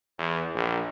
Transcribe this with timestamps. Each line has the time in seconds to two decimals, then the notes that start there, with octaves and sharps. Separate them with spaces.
0.19 E2
0.55 A#1